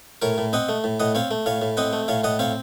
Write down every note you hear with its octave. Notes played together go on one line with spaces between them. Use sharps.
A2 A#4 C#5
A2
C4 D#5 F#5
A3
A2
A2 D#5 F#5
C4 C#5 F5
A3
A2 C#5 F5
A2
C4 D#5 F#5
A3
A2 C#5 F5
A2 D#5 F#5
C4 C#5 F5